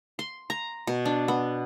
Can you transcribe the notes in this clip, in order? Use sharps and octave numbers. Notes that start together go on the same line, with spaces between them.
C6
A#5
B2
D4
B3